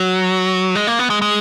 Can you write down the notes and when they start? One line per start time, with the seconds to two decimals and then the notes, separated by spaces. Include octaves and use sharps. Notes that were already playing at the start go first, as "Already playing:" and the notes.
Already playing: F#3
0.75 G#3
0.87 A#3
0.99 B3
1.10 G#3
1.22 G#3